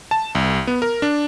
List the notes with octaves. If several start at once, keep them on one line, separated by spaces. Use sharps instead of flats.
A5
C2
B3
A#4
D4